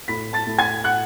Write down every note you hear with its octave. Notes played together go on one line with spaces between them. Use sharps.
A2 B5 B6
A5 A6
A2
G#5 G#6
F#5 F#6